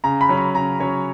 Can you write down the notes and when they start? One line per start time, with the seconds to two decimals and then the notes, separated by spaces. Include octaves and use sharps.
0.04 C#3 A#5
0.21 B5
0.29 F#3 C#4
0.37 B5
0.55 C#3 A#5
0.79 F#3 C#4 C#5